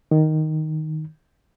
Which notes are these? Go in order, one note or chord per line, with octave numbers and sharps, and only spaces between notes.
D#3